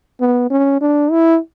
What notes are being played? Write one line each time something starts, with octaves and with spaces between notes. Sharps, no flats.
B3
C#4
D4
E4